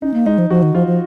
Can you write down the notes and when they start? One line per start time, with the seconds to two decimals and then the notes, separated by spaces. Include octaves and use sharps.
0.02 C#4 D#4
0.14 A#3
0.26 G#3 D#4
0.38 F3
0.50 F3 F#4
0.63 D#3
0.74 F3 F4
0.87 F3